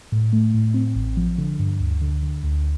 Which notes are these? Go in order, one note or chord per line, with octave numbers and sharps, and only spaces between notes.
A2
A3
A2
C4
A1
F3
D3
G2
D2
D3
D3
D2